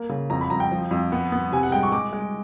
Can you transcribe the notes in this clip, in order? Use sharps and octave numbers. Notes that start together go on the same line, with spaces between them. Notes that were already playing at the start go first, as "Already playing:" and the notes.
Already playing: A#3
C#3
F2 A#5
B5
F2 A#5
G5
F3
F2
B3
B3
C3 G#5
F#5
G#3 G5
C#6
G#3 D6
G#3